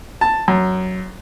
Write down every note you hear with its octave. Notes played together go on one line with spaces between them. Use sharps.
A5
F#2